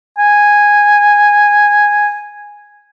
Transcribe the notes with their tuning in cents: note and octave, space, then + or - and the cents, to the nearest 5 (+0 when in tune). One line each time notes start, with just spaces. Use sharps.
G#5 -5